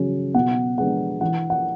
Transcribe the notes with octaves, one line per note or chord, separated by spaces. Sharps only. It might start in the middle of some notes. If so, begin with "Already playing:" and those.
Already playing: C#3 F#3 C#4
B2 F#5
G#3 B3 D4 F#5
E3 F#5
F#5